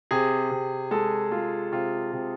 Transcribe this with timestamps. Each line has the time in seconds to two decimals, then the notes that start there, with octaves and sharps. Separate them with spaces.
0.11 C3 G#4
0.51 C3
0.91 G#3 A4
1.31 G#3 F4
1.72 C3 F4
2.13 C3